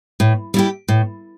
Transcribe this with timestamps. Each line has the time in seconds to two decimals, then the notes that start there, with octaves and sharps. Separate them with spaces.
0.20 A2
0.54 G3 E4 G4
0.88 A2